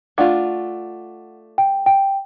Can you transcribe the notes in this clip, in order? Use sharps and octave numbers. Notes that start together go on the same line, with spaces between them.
A3 D4 F4 F#5
G5
G5